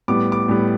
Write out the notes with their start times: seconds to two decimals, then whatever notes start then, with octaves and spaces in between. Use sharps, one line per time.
0.08 A2 G3 B3 D6
0.32 D6
0.48 A2 G3 B3